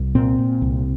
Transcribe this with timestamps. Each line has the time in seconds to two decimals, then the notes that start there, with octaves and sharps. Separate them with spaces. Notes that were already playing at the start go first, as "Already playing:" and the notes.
Already playing: C2
0.15 A#2 C4
0.39 A#2
0.62 C2